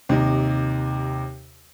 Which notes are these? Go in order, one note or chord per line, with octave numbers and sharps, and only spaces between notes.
D#2 C3 D#4